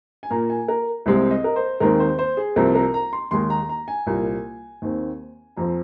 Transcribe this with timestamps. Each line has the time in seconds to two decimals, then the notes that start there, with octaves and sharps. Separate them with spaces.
0.23 G#5
0.30 A#2 A#3 A#5
0.50 G#5
0.68 A#4
1.06 C2 C3 G#3 C4
1.31 D#5
1.44 A#4
1.56 C5
1.80 D#2 D#3 G#3 C4 A#4
2.00 C5
2.19 C5
2.37 G#4
2.56 C2 C3 F3 C4 A#4
2.75 A#4
2.94 A#5
3.13 C6
3.31 D#2 D#3 G#3 C6
3.50 A#5
3.69 A#5
3.88 G#5
4.06 C2 A#2 A#3
4.82 D#2 D#3 C4
5.57 F2 F3 C4 A#5